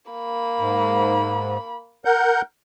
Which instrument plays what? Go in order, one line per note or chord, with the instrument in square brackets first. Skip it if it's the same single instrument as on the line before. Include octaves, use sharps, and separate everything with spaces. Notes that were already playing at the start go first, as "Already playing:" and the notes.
[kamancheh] A#3 B5
[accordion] G#2
A#4 F#5 G6